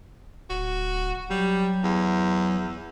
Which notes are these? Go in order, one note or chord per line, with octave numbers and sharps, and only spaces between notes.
D1 F#4
F#3 G3
E2